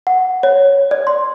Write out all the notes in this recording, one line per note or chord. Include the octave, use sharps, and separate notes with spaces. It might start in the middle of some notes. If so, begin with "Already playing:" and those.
F#5
C#5
D5
C6